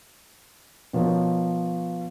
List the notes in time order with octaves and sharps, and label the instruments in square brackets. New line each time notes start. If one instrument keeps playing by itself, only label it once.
[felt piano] B2 F3 A#4 C#5